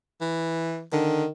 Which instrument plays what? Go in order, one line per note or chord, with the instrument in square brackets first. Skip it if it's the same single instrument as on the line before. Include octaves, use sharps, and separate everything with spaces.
[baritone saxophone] E3
[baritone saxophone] D3 [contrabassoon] D#3